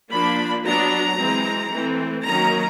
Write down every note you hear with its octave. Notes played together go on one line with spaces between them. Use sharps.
F3 A#3 D4 B5
F#3 B3 D4 A#5
E3 G#3 C4
E3 A3 C4
D#3 F#3 A#3 C#4 A#5